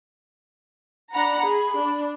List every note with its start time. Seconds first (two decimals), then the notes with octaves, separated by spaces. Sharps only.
1.13 D4 F#5 A#5 B5
1.44 G#4
1.79 D4